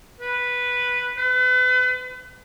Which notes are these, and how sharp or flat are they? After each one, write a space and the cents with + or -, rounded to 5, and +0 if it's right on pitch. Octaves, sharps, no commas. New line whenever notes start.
B4 -5
B4 +35